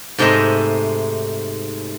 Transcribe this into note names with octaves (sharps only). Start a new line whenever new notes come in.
G#2 C3 A3 D#5 E5 A#5